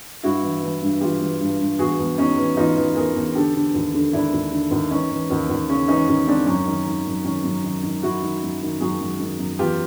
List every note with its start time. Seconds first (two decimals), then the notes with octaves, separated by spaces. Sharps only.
0.23 G2 E4 F#4
0.43 E3
0.63 E3
0.82 G2
1.01 E3 F4 G4
1.21 E3
1.41 G2
1.60 G2
1.79 E2 F#4 G#4
1.99 E2
2.18 E2 C#4 D#4
2.38 E3
2.57 E2 D#4 F4
2.76 E3
2.96 E2 G#4 A#4
3.15 E2
3.35 D3 G4 A4
3.55 D3
3.74 D#2
3.94 D3
4.13 D#2 D4 E4
4.33 D#2
4.52 D3
4.71 D#2
4.91 E3 C#4 D#4
5.11 E3
5.29 D#2 C#4
5.50 D#2
5.70 C#3 C#4
5.88 E3 C#4 D#4
6.08 D#2 C#4
6.27 C#3 C4 D4
6.46 F#2 C#4
6.66 D#3
6.86 D#3
7.06 F#2
7.24 D#3 C#4
7.44 F#2
7.64 D#3
7.83 D#3
8.03 F#2 E4 F#4
8.22 D#3
8.42 F#2
8.62 D#3
8.80 F#2 F#4 G#4
9.00 F#2
9.20 D#3
9.39 F#2
9.58 E2 F4 G4